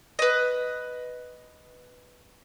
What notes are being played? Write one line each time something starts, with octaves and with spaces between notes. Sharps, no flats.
B4 D#5